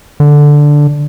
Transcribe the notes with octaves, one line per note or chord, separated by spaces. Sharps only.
D3